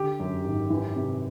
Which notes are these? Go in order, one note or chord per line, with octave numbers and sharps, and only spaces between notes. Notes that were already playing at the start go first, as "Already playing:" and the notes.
Already playing: D3 G4
F#2
G#1
E3
C3